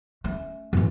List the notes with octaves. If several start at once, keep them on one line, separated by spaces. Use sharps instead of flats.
A3 C#4
A1 F#2